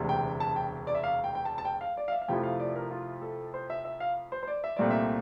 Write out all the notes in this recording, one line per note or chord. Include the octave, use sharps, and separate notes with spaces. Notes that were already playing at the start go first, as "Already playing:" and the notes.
Already playing: E1 D2 C3
G5
A5
G5
D5
E5
F5
G5
G5
A5
A5
G5
F5
D5
F5
E5
F5
F2 C3 F3 A3 E4 G5
F5
D5
A#4
F4
A4
C5
E5
E5
F5
C5
C5
D5
E5
C2 A#2 A3 C4 D5
E5